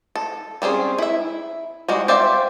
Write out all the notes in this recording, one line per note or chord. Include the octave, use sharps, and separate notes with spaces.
A4
G3 C4 C#4 G#4
E4 E5
G3 G#3 F#4
G4 C5 D5 E5 F5